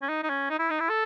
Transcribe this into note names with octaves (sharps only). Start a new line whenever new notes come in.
C#4
D#4
D#4
C#4
D#4
E4
D#4
E4
A4